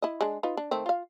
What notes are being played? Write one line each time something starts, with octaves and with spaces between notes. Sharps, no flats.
E4 D#5
G#3 D4
D#4 F4 B4
D4
D#3 A3 C4
F4 F5